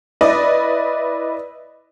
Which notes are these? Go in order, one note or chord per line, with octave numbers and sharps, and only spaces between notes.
E4 B4 D5 D#5